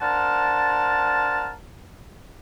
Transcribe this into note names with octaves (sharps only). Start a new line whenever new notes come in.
D4 A#4 C5 F5 F#5 A5